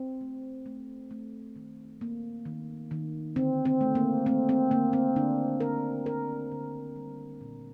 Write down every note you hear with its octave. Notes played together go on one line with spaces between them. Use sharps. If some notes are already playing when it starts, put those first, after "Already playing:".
Already playing: C4
A3
A3
A3
D#3
A#3
D#3
D#3
D3 C4
C4
A3
A#3
A3 C4
C4
D3 A#3
C4
D3 D4
D3 A#4
A#3 A#4
D3
G3
A#2